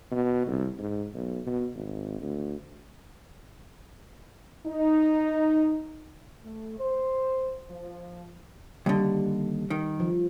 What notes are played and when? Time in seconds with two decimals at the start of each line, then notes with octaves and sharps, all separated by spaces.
0.11 B2
0.47 C2
0.78 G#2
1.14 B1
1.46 B2
1.75 G#1
2.21 D2
4.67 D#4
6.44 A3
6.79 C5
7.71 F3
8.86 D#2 D3 G3
9.70 D#3
10.00 F3